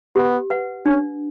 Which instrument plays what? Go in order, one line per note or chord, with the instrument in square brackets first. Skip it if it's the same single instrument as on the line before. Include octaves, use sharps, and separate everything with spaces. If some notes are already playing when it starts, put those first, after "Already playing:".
[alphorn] B3 [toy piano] G4
[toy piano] B4 F#5
[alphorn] C#4 [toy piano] D4